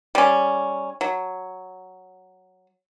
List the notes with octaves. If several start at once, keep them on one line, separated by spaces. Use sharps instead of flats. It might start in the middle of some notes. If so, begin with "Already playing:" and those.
G3 C#4
F#3